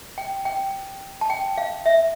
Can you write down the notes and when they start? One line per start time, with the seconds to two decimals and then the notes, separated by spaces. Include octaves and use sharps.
0.18 G5
0.45 G5
1.21 A5
1.30 G5
1.58 F5
1.86 E5